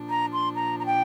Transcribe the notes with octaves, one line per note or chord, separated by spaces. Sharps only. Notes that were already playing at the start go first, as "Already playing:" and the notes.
Already playing: A#2 F3 D4
A#5
C6
A#5
A#5
G5